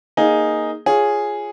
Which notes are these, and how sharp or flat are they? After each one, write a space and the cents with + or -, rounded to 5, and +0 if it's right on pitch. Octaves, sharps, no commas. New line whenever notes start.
A#3 +0 D#4 +0 G#4 +0
F4 +0 G#4 +0 C#5 +0